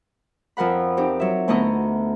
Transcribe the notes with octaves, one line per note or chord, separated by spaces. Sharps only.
F2 F3 A#4 F#5 B5
C4 D#4 G4
F#3 E5
D2 A3 B3 E4 D#5 A#5